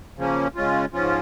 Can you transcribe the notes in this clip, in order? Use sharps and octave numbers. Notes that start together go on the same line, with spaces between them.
C#3 F3 A#3 C#4
C#3 G#3 C#4 F4
G#2 F3 C#4 F4